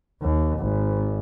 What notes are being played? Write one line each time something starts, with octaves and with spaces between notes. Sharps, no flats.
D#2
G#1